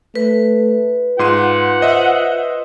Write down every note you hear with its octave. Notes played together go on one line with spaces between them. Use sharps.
A3 B4
G#2 F4 F#5 C6 D#7
C5 D#5 E5